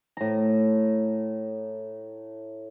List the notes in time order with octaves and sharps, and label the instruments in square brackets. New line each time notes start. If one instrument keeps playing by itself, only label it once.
[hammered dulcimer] A2 A#5